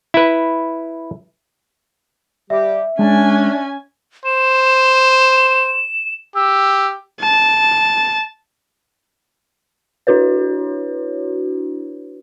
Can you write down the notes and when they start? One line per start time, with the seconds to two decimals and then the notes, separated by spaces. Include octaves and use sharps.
0.14 E4 B4
2.50 G3 G4 E5
2.99 G#3 C#4 D4 G#5
4.25 C5 E7
6.35 G4 E6
7.21 A5
10.07 D4 E4 F#4 B4 C#5